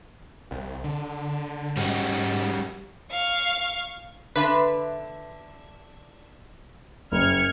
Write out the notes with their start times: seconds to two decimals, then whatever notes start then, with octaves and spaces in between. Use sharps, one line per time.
0.51 C2
0.84 D3
1.77 G#2 G3 C#4 F#4
3.11 F5 C#6
4.36 D3 B4 E5
7.12 F#1 F6 G#6 C#7